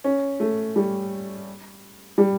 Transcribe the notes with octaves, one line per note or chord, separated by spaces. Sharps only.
C#4
A3
G3
G3